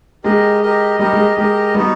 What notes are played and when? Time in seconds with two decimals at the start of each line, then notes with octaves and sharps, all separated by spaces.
0.24 G#3 G4 A#4 D#5
0.62 G4 A#4 D#5
0.99 G3 G4 A#4 D#5
1.12 G#3
1.37 G#3 G4 A#4 D#5
1.74 G3 B3 D#4 F#4